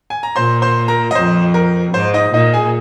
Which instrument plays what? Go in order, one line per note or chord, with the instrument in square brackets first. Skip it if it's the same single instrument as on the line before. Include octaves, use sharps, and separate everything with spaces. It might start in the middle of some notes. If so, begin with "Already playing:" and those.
[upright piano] G#5
A#5
[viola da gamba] A#2 [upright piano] C5 C6
[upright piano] C5 C6
A#4 A#5
D#5
[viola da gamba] F2 [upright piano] C5
[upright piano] A#4
[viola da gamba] G#2 [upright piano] C5
[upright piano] D#4 D#5
[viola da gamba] A#2 [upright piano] D#4 D#5
[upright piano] G#4 G#5